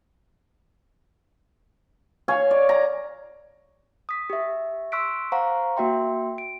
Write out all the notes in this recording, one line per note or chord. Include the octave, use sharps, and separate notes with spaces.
C#5 F5 G#5
D5
A#5
D#6 B6
G4 E5
C6 C#6 E6 F#6 B6 D7
C5 F5 F#5 A#5 C#6
A#3 F#4 E5 G5 C6
D7